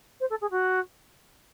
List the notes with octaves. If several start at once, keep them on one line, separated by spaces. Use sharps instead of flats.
C5
A4
G#4
F#4